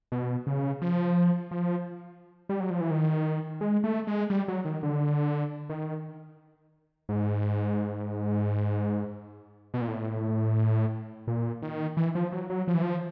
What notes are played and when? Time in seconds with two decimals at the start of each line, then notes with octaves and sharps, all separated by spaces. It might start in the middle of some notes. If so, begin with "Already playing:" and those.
0.12 B2
0.47 C#3
0.82 F3
1.51 F3
2.49 G3
2.60 F#3
2.70 F3
2.81 E3
2.91 D#3
3.61 G#3
3.84 A3
4.07 G#3
4.30 G3
4.48 F#3
4.65 D#3
4.83 D3
5.70 D#3
7.09 G#2
9.74 B2
9.81 A#2
9.88 A2
11.27 A#2
11.62 D#3
11.97 E3
12.15 F3
12.32 F#3
12.50 F#3
12.68 F3
12.75 E3
12.82 F3